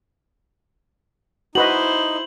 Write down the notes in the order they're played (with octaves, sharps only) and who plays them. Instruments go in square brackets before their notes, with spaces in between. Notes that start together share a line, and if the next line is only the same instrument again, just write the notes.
[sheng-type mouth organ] D#4 [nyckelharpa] E4 C5 [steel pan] F#4 B4 D#5 [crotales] F#7